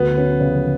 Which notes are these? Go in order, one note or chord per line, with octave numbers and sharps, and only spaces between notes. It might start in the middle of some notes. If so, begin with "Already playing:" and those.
Already playing: D2 B3
C#4
C#3